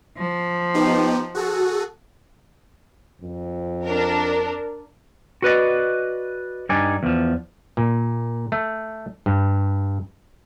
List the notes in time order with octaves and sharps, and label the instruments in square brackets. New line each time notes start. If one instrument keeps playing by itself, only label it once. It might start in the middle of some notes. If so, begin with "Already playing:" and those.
[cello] F3
[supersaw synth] B3 D#4 G4
F#4 G#4 A4
[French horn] F2
[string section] D4 A#4
[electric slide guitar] F#4 B4 D5 D#5
G2 D#4 D5 G#5
E2 F3
[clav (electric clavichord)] A#2
A3
G2